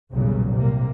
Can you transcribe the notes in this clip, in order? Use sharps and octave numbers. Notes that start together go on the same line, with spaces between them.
B1 E2 A#2 C#3 F#3 G3
C3 G3 A#3